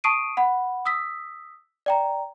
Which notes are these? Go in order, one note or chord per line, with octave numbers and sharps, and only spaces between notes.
A5 C#6 D#6 C7 D7 D#7
F#5 B5
D#6 E6 B6
D5 G5 A#5